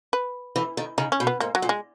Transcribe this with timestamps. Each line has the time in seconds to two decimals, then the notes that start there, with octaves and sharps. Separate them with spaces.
0.13 B4
0.56 E3
0.77 D#3
0.98 C#3 D#4
1.12 C#4
1.20 B2
1.27 B3
1.40 G#2 A#3
1.55 F#3
1.62 A#2
1.69 G#3